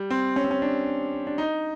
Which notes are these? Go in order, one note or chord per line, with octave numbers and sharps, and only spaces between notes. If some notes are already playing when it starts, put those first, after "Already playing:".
Already playing: G3
C4
C#4
C4
C#4
D4
D4
D#4